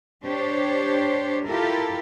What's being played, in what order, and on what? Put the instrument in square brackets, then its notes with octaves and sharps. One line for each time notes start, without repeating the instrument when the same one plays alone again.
[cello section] D4 G4 C5 C#5
E4 F4 G4 A4 A#4